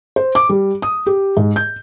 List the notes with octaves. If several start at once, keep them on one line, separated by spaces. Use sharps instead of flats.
C5
D6
G3
D#6
G4
G#2
G6